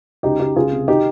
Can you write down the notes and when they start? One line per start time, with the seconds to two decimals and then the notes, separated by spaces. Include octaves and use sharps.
0.23 C#2 D#4 G4
0.39 C#2 D#4 G4
0.56 C#2 F4 G#4
0.72 C3
0.88 D#3 D#4 G4